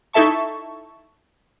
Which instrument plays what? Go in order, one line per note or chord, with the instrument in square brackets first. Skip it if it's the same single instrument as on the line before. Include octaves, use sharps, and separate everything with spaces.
[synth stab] D#4 E4 A4 E5 A5 C#6